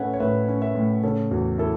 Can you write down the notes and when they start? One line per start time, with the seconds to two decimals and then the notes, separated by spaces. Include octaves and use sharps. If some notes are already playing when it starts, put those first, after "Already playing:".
Already playing: A2 A3 C#4 B4 C#5 E5 F#5
0.14 C#5
0.20 A2 B4 E5
0.48 C#4
0.62 B4 E5
0.75 A2
1.03 C#3 A4 C#5
1.31 E2 F#4
1.58 E4 A4